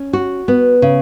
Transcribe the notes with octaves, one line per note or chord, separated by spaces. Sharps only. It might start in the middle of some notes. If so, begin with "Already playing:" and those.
Already playing: C#4
F#4
B3
C#3